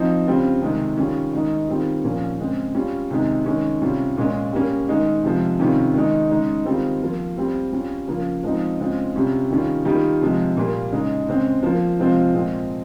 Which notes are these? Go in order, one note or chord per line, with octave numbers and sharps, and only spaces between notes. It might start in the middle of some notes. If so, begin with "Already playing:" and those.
Already playing: F3 C4 D#4
C#3 G3 C4 F4
C3 D#3 G#3
D#3 G3 C#4 F4
D#3 G#3 D#4
D#3 G3 C4 F4
A#2 F3 A#3 C#4
C#3 G#3 C4
G3 C#4 F4
C3 D#3 G#3 D#4
D#3 G#3 C#4
C3 G3 C#4 F4
A#2 G#3 C#4
G3 A#3 C#4
D#3 G#3 D#4
C3 F3 G#3
C3 D#3 G3 C#4 F4
D#3 G#3 D#4
C#3 G#3 D#4
D#3 G3 C4 F4
F3 A#3 F4
G3 C4 F4
G3 C#4 F4
C#3 F3 A#3 F4
F3 G#3 C4 D#4
C#3 G#3 C4 F4
C3 G3 C#4 F4
D#3 G3 C#4 F4
D#3 G3 A#3 F4
C3 F3 G#3
A#2 G3 A#3
C#3 G#3 D#4
C#3 G#3 C4
F3 A#3 F4
C3 F3 G#3 C4 F4
A#2 G#3 C4